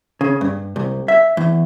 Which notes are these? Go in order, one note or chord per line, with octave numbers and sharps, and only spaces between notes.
C#3
G2
C2
E5
E2